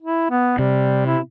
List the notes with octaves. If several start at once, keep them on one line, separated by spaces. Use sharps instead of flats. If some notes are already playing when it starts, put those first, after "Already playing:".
E4
B3
C3 G3
E4